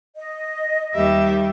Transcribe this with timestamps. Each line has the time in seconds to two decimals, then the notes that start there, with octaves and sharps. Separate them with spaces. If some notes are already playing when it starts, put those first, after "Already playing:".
0.16 D#5
0.95 D#2 G3 E5